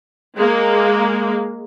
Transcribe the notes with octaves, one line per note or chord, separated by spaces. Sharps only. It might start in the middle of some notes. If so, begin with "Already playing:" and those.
G#3 A#3